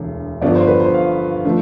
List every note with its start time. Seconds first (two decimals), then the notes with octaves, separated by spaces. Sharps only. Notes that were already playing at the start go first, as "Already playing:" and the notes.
Already playing: E1 D2
0.41 G1 G2 F3 B3 D5
0.55 C5
0.68 B4
0.80 C5
0.94 F5
1.45 D3 F3 A3